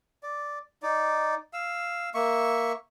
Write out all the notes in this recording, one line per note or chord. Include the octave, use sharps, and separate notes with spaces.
D5
D#4 D5
F5 E6
A#3 E5 C#6